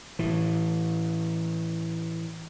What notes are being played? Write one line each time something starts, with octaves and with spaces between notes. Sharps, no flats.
A2 E3